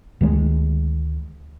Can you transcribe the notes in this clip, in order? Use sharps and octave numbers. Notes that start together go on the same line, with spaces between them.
D2 D#3 G#3